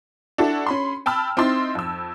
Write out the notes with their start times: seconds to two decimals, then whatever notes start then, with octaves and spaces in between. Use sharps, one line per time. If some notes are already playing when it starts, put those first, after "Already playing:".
0.38 D4 E4 F#4 A4
0.67 C#4 B5 C6
1.06 G5 A5 B5 E6 F6
1.37 C4 D#4 E4 C6 A6
1.75 F2 E6